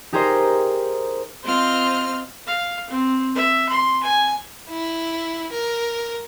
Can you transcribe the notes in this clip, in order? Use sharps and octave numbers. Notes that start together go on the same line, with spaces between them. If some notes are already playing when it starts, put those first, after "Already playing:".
D#4 G4 G#4 A#4 C5 D#5
C4 F4 C5 D#5 F6
F5
C4
E5
C6
G#5
E4
A#4